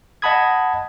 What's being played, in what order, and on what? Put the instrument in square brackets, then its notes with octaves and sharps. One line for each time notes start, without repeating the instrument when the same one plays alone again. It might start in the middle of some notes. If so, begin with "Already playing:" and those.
[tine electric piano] D#5 F#5 A5 B5 D#6 G#6